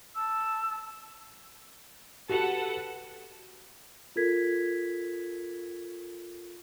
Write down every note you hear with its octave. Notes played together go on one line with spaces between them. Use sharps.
A5 E6
F#4 G4 A4 B4 F#5
F4 A4 A#4 G#6 B6